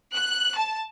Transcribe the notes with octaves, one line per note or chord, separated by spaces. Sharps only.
F#6
A5